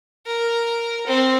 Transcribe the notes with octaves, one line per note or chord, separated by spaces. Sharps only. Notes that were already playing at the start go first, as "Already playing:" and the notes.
A#4
C4